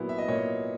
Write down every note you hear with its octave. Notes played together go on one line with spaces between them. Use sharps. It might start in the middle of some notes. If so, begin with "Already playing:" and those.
Already playing: A#2 F#3 B3 E4
E5
D#5
A#2 C#5